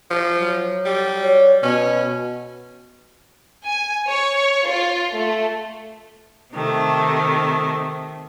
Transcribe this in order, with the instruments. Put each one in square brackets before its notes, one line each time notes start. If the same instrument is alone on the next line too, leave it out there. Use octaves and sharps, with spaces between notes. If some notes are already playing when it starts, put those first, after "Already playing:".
[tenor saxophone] F3
[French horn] F#3
[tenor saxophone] G3
[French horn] C#5
[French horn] B2 [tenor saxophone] C#4
[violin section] G#5
C#5
F4
A3
[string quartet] C3 D#3 A3